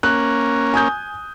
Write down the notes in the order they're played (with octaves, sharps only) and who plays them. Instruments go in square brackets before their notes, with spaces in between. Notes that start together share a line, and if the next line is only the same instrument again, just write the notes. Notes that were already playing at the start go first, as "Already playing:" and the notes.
[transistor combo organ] A#3 C#4 [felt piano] F#6
[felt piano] G#5 D#6 G6